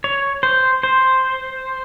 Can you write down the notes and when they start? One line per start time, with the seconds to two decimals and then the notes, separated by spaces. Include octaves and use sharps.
0.04 C#5
0.43 C5
0.83 C5